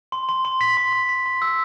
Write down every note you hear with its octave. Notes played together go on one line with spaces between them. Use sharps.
C6
C6
C6
B6
C6
C6
B6
C6
E6